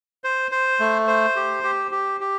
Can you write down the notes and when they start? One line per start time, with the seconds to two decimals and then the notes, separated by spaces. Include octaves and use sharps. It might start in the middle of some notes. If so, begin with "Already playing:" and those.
0.24 C5
0.51 C5
0.80 A3
1.07 C5
1.36 G4
1.63 G4
1.91 G4
2.21 G4